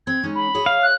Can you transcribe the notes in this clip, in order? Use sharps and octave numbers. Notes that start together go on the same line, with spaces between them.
C4 G#6
G#3 C#4 D#4
B5
G#4 C#5 E5
F5
F#6